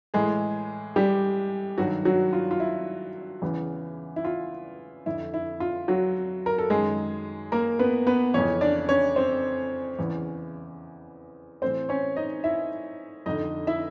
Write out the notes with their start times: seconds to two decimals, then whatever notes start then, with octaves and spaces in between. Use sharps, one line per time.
0.14 A2 E3 G#3 G#4
0.96 G3 G4
1.78 G2 D#3 F#3 F#4
2.05 F#3 F#4
2.33 F4
2.51 F4
2.60 E4
3.42 E2 C#3 E3
4.16 E4
4.25 F4
5.06 F2 D3 E4
5.34 E4
5.60 F4
5.88 F#3 F#4
6.46 A#4
6.58 A4
6.70 F#2 D#3 G#3 G#4
7.52 A#3 A#4
7.79 B3 B4
8.07 B3 B4
8.34 F2 C#3 E3 C#4 C#5
8.61 D4 D5
8.89 C#4 C#5
9.16 C4 C5
9.99 E2 C#3 E3
11.62 A2 C4 C5
11.66 E3
11.89 C#4 C#5
12.17 D#4 D#5
12.44 E4 E5
13.26 F2 D3 D#4 D#5
13.67 E4 E5